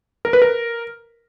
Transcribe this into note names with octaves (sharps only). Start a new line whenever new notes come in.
A#4
B4
A#4